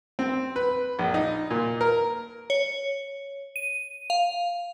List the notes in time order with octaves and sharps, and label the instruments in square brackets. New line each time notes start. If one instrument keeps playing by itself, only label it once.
[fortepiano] C4
B4
A#1
D#4
A#2
A#4
[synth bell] C#5
D#7
F5